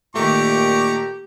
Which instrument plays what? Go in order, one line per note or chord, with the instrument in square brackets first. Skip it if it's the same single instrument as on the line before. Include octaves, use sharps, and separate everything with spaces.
[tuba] A#2 [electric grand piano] D#3 A3 [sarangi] G4 [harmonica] A#5 C#6 D6